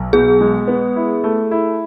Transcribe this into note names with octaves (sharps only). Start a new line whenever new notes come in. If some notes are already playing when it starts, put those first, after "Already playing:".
Already playing: B1
B2 G#4
G#3
B3
E4
A3
E4